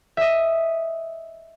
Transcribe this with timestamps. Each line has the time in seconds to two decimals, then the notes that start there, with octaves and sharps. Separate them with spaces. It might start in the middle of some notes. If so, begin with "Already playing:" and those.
0.17 D#5 E5